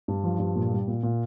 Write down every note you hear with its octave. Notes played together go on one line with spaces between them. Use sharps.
G2
F3
G2
A#2
G3
A#2
A#2